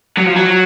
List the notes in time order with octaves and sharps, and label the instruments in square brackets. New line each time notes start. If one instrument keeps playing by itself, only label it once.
[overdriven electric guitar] F#3
F3
F#3